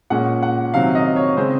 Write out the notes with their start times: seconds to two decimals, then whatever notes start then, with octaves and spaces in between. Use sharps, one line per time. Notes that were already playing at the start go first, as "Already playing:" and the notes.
0.10 A#2 G#3 C#4 F#5
0.42 F#5
0.74 C3 D#3 F#3 C4 F5
0.95 D#5
1.16 C#5
1.36 C#3 G#3 C4 C5